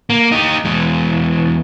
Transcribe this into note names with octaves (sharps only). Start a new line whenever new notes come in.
A#3
D#4 G4
E2 G#3